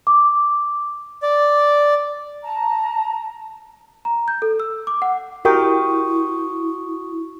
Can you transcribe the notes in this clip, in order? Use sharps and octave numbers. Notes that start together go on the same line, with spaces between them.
D6
D5
A5 A#5
A#5
G6
A4
E6
D6
F#5
E4 F#4 G4 A#4 G5 C#6 D#6